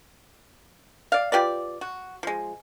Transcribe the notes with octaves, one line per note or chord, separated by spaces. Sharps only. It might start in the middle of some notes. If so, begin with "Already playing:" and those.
D5 F5
F4 G4 B4 D5
F#4
F3 G#3